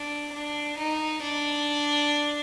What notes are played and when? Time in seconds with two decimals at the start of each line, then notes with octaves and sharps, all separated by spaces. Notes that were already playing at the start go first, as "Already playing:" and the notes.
Already playing: D4
0.33 D4
0.78 D#4
1.22 D4